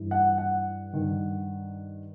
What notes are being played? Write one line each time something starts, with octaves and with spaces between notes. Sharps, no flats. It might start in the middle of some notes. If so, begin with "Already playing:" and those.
Already playing: G2 E3
F#5
F#5
G2 D#3